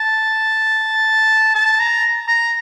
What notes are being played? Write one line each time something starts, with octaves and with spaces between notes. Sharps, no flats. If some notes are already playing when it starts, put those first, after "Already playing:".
Already playing: A5
A5
A#5
A#5